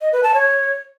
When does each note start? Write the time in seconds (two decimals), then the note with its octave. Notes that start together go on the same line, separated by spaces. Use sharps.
0.01 D#5
0.12 B4
0.23 A5
0.34 C#5